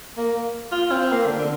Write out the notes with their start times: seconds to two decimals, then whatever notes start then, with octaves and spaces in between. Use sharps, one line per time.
0.18 A#3
0.72 F4
0.92 C4
1.12 A#3
1.26 D3
1.39 D3